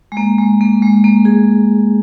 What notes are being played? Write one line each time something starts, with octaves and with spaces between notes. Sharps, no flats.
G#3
A#3
G#3
A#3
G#3
A#3
G#4